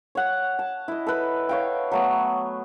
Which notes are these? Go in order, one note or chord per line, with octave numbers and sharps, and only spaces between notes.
C#5 F#5
A5
E4 D#5
A4 B4
C#5 F5 G5
F#3 A3 B3